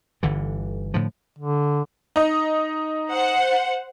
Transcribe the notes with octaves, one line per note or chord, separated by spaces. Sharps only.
G1 D3 E3
A2 D3 F3
D3
D#4 D#5
C5 F#5